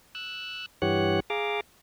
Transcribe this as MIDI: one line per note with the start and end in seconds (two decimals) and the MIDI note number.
0.15 0.66 88
0.15 0.66 90
0.82 1.20 43
0.82 1.20 52
0.82 1.20 67
0.82 1.20 73
0.82 1.20 78
0.82 1.20 90
1.30 1.61 68
1.30 1.61 77
1.30 1.61 82
1.30 1.61 86